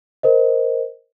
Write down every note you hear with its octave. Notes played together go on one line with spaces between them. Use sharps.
A#4 C5 D#5